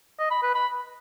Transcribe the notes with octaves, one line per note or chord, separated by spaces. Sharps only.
D#5
B5
B4
B5